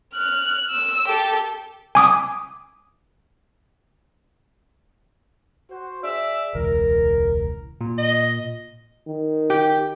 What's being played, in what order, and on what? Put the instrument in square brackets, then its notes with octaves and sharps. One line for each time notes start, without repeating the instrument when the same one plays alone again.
[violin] F6 F#6
E6
G4 A4
[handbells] G#5 D6 D#6
[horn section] F#4 C5
G#4 D5 E5
[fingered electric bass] E1 C#2 E3 [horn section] A#4
[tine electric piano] A#2
[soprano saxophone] D#5
[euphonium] D#3
[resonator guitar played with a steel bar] G4